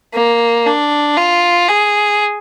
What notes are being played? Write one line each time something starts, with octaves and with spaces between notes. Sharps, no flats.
A#3
D4
F4
G#4